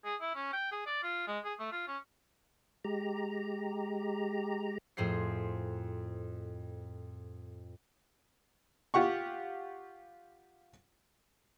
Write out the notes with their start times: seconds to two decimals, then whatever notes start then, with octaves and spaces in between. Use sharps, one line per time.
0.05 G#4
0.21 E4
0.35 C#4
0.53 G5
0.72 G#4
0.86 D5
1.03 F4
1.27 G#3
1.44 G#4
1.59 A3
1.72 F4
1.87 C#4
2.84 G#3 G4 A#5
4.97 F2 A2 G#4 C5 C7
8.94 F4 G4 F#5 C#6